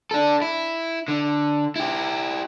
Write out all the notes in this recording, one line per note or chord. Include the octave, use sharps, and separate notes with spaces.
D4 A4
E4
D3
E4 G4